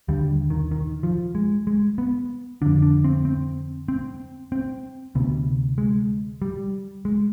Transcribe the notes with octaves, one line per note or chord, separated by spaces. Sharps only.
D#2 D3 G3
D#3
D#3
F3
G#3
G#3
B3
F2 D3 D4
D4
C4
C4
C4
C4
D2 C3 B3
G#3
G3
G#3